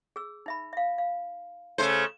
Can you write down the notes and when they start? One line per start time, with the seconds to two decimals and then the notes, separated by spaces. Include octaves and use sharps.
0.16 G#4 E6
0.46 D#4 E5 B5
0.73 E5 F5
0.98 F5
1.78 C#3 A3 C5